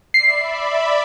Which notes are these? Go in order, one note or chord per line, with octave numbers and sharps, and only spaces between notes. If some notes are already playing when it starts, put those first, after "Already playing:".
D5 E5 B5 C7